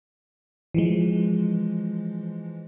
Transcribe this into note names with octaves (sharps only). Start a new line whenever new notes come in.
E3 F3 G#3